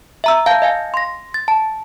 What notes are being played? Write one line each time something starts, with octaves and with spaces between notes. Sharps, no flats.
E5 A#5 E6
F5 A5 G6
D#5 F5 G#5
C6 A#6
A6
A5